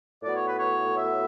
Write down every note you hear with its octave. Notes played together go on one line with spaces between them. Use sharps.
A2 F#3 B3 D5
C#5
B4
C#5
E5